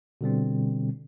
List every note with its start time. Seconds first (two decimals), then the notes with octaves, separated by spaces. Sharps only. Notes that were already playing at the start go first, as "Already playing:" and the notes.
0.21 B2 D3 G3 C4